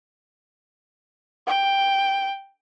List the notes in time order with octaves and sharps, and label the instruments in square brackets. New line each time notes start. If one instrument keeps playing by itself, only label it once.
[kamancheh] G5